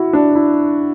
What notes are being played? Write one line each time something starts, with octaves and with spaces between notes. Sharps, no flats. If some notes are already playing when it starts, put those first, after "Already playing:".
Already playing: E4 F#4
D4
E4